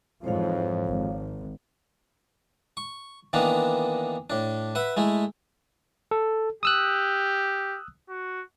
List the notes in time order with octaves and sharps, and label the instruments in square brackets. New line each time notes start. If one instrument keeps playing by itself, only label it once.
[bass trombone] F2 [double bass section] G#2 E3 F3 [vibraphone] C5 C#5 F5
[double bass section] G#1
[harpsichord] C#6
D#3 E3 A#3 B3 D4
A2 D4
B4 E5 F#5
G#3 A3 E4
[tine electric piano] A4
[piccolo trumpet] G4 [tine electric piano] D#6 E6 F#6
[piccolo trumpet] F#4